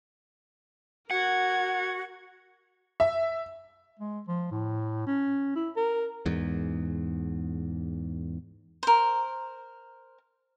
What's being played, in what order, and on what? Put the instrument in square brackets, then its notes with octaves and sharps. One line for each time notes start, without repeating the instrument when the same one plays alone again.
[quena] F#4 [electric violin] A#4 G#6 [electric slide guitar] F#5
[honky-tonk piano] E5
[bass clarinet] G#3
F3
A2
C#4
E4
A#4
[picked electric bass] E2 G#2
[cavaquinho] A#4 C5